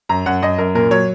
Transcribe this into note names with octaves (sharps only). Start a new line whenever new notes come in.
F#2 A#5
F#2 F#5
F#2 D#5
F#2 A#4
A#2 A#4
F#3 C#5